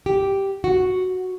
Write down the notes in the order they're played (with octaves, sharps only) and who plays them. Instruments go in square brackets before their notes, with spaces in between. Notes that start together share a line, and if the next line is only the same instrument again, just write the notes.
[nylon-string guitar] G4
F#4